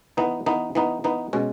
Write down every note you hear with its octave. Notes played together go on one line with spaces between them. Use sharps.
E3 B3 D#4
E3 B3 D#4
E3 B3 D#4
E3 B3 D#4
B2 G#3 C#4